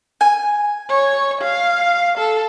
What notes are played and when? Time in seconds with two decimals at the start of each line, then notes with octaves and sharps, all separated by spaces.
0.21 G#5
0.89 C#5
1.41 F5
2.18 A4